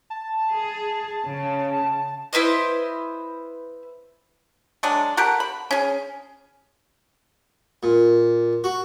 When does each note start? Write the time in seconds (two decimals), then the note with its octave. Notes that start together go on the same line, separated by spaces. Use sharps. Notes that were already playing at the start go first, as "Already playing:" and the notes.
0.10 A5
0.51 G#4
1.25 C#3
2.33 E4 B4 C5 D#5
4.83 F#3 G#3 D4
5.17 G4 A4 A#4 F#5
5.40 B5
5.71 C#4 G#4
7.83 A#2
8.64 F#4